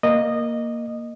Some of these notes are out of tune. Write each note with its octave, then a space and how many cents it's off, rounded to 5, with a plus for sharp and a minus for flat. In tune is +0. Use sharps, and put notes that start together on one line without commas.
A#3 +0 D#5 -15